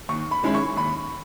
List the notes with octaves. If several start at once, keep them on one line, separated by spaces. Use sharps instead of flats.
D#2 C#6
B5
D#3 G#3 C#4 E4 B5
C#6
D#2 B5